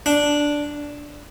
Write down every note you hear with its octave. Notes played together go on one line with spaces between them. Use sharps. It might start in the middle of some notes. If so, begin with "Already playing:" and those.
D4